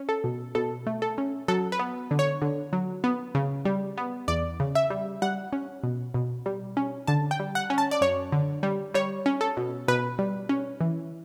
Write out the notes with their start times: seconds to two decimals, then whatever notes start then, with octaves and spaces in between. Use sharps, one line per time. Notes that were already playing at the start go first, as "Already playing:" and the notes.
Already playing: C#4
0.09 A4
0.24 B2
0.55 B2 A4
0.87 A3
1.02 A4
1.18 C#4
1.48 F#3 A4
1.72 B4
1.79 B3
2.11 D3
2.19 C#5
2.42 D3
2.73 F#3
3.04 B3
3.35 C#3
3.65 G3
3.97 B3
4.28 E2 D5
4.60 C#3
4.75 E5
4.90 G3
5.22 G3 F#5
5.53 C#4
5.83 B2
6.14 B2
6.46 G3
6.77 C#4
7.07 D3 A5
7.31 G5
7.39 G3
7.55 F#5
7.70 C#4
7.78 A5
7.91 D5
8.01 F#2 C#5
8.32 D3
8.63 G3
8.94 G3 C#5
9.26 C#4
9.41 A4
9.57 B2
9.88 B2 B4
10.19 G3
10.49 C#4
10.81 E3